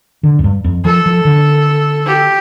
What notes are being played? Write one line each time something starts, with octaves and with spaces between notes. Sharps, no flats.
D3
F2
G2
F2
F3 A4
F3
D3
G4